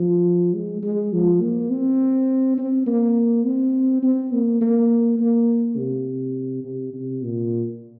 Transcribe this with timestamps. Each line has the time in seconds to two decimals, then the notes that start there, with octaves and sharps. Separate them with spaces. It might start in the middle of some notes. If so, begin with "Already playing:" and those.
Already playing: F3
0.55 G#3
0.83 G#3
1.12 F3
1.41 A#3
1.70 C4
2.58 C4
2.86 A#3
3.45 C4
4.03 C4
4.32 A#3
4.61 A#3
5.19 A#3
5.77 C3
6.64 C3
6.93 C3
7.23 A#2